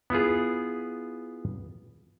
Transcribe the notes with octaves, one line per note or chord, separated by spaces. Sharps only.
B3 E4 F4 G#4